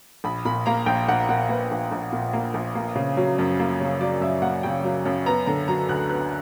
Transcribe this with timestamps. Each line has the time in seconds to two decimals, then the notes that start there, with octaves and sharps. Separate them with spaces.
0.24 A#1 B5
0.45 A#2 B5
0.66 A#3 A#5
0.86 A#1 G5
1.08 A#1 F#5
1.29 A#2 F#5
1.49 A#3 B4
1.71 A#1
1.92 A#1
2.13 A#2
2.33 A#3
2.54 A#1
2.75 A#3
2.96 C#3
3.17 F#3
3.38 F#2
3.59 A#3
3.80 C#3
4.00 F#3 D5
4.21 F#2 E5
4.42 A#3 F#5
4.63 C#3 G5
4.84 F#3
5.05 F#2
5.26 B3 A#5
5.47 D3 A#5
5.68 F#3 A#5
5.89 D2 F#6
6.09 B3 F#6